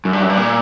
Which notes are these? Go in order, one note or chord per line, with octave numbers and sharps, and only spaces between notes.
F#2
G2
F#2
G2
A#2